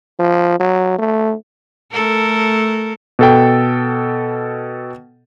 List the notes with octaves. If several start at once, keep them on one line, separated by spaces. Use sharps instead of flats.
F3
F#3
A3
A3 A4 A#4
B2 A4 G5